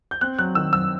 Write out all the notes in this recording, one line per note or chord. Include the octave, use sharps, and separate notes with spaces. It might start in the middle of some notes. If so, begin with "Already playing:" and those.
G6
C4 F#6
F#3 F#6
D#3 E6
F#2 E6